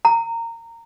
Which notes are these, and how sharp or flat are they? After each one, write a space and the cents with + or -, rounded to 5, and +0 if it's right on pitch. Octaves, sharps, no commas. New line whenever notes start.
A#5 -20